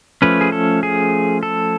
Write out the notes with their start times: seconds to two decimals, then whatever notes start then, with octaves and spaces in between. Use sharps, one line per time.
0.22 F3 A3 C#4 B4
0.41 G#4
0.52 A4
0.83 G#4
1.43 A4